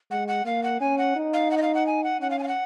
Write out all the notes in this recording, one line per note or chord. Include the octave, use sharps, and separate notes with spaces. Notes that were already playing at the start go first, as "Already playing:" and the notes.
G#3 F#5
F#5
A#3 F5
F#5
C#4 G#5
F#5
D#4
F5
F#5
D#5
F5
F#5
G#5
F#5
C#4 F#5
F5
G#5
F5
F#5